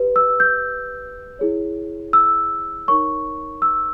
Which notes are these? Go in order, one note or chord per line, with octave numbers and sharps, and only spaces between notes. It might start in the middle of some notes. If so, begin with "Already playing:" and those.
Already playing: G4 B4
E6
G6
E4 G#4 C#5
E6
D#4 A#4 C#5 C#6
E6